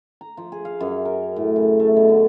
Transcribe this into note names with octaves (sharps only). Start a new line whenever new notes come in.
A#5
F3
G#4
F5
F#2
A#4
A2
C#3
A3
B2
D3